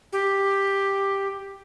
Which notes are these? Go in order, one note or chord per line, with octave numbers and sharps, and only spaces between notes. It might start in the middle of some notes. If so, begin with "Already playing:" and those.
G4